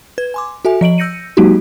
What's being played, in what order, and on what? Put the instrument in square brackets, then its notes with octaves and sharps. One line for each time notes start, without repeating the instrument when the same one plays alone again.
[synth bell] B4 G#6
G#5 C6 D6
F#4 A4 E5 G#5
F3 D#5 D7 F#7
E6 G6 A#6 C#7 D#7
F#3 G#3 A#3 D#4 F#4 G4